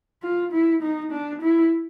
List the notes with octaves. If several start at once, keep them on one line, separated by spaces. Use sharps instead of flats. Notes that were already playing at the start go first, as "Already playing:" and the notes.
F4
E4
D#4
D4
E4